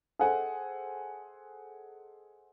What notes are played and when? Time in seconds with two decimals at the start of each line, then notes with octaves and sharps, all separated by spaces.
0.19 G#4 A4 C5 D#5 F#5 G#5